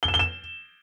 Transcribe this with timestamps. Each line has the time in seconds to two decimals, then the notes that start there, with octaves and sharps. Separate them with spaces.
0.03 G7
0.08 E7
0.14 G7
0.19 E7